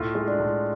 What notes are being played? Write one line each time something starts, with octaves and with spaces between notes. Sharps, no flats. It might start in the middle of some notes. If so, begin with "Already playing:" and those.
Already playing: A2 F4
G#3
D4
A2